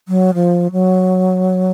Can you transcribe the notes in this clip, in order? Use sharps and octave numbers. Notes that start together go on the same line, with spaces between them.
F#3
F3
F#3